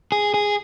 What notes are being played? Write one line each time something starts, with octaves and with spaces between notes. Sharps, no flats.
G#4
G#4